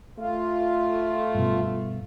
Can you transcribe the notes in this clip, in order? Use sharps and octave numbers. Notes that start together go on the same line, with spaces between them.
A3 F4
G2 B2